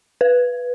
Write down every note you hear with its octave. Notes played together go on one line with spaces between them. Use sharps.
B4